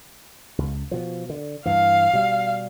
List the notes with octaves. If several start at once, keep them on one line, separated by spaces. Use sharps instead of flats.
C#2
B2 F3
D3
G2 E3 F5
B2 G3